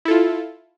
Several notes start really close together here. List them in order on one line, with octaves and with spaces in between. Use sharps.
E4 A4 F4